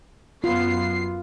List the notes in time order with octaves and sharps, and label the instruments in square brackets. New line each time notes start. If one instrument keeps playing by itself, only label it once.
[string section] F#2 B3 C7 [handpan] F4